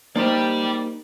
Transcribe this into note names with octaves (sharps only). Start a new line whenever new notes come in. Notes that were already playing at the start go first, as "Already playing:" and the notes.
A#3 D#4 G4 C5 D5